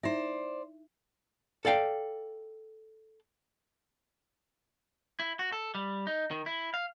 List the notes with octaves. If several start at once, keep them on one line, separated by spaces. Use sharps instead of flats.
D#4 E4 C5 D5 E5
A4 D5 F5 G5
E4
F#4
A4
G3
D#4
D#3
E4
F5